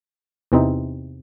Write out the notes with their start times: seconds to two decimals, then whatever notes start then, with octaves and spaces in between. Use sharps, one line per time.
0.52 E2 C3 E3 C4 D#4